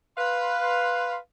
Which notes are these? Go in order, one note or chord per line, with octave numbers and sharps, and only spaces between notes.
B4 F5 C6